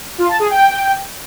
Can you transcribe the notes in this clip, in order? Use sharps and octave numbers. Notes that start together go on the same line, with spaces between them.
F4
A5
G#4
G5